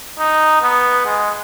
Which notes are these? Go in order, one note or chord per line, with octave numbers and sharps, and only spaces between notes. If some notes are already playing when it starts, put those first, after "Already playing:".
D#4
B3
G#3